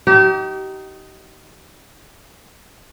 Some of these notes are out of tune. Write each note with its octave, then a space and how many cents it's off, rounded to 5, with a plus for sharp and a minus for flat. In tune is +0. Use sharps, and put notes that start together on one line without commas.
D#4 +5 G4 -35